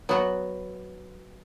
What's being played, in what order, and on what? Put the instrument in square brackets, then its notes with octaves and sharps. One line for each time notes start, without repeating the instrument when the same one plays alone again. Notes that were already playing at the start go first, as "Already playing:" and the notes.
[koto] F#3 B3 F#4